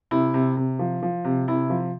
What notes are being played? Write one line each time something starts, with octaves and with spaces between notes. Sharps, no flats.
C3 E4
C3
C3
F3
F3
C3
C3 E4
F3